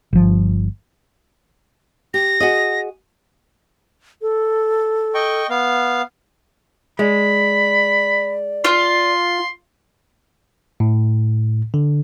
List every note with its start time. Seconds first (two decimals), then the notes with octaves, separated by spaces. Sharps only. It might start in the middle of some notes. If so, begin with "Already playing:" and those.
0.13 G1 F3
2.14 G4 A#6
2.40 F#4 G#4 D#5
4.22 A4
5.14 D#5 G5 C#6
5.50 B3 F5
6.99 G#3 D5 B5
8.65 F4 C6
10.80 A2
11.74 D3